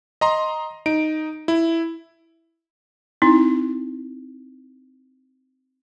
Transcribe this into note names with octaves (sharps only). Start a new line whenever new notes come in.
D#5 A#5 C6
D#4 D7
E4
C4 D#4 E4